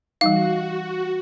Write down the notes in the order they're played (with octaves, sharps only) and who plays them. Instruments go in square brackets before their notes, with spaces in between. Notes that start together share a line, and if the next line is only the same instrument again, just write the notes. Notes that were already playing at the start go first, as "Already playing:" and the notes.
[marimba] E3 G3 D#4 [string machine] F#4 [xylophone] F5